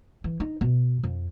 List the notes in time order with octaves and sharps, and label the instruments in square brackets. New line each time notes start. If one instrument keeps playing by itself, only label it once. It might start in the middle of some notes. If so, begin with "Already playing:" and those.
[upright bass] E3
D#4
B2
F2